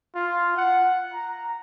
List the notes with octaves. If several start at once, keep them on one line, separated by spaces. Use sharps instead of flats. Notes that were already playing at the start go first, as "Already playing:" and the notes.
F4
F#5
A#5